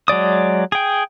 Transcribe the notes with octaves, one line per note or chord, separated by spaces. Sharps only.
F#3 G#3 D5 D#6
G#4 G5